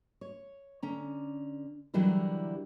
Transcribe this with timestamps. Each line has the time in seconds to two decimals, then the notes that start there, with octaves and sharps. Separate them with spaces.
0.21 C#5
0.83 D3 C#4 A#5
1.94 D3 E3 F#3 G3 E4 A#4